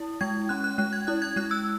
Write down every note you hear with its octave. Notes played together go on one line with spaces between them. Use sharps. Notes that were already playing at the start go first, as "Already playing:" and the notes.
Already playing: E4
G#3 G#6
C#4 F#6
F#6
G#3 F#6
G#6
E4 F#6
G#6
G#3 F#6
E6